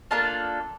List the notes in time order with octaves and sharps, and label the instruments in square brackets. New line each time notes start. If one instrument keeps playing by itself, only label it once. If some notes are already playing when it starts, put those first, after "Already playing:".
[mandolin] A#3 D4 F4 A4 A5